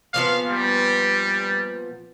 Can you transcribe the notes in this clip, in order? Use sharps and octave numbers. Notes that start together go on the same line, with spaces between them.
A#2 F3 B3 F5
G3